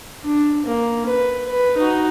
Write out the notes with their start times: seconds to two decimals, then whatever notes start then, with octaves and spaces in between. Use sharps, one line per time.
0.24 D4
0.66 A#3
1.06 B4
1.46 B4
1.77 D#4 F#4